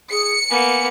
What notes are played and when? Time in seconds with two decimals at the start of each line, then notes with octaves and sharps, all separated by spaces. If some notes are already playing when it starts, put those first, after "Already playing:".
0.11 G#4 C#7
0.50 A#3 B3 G#5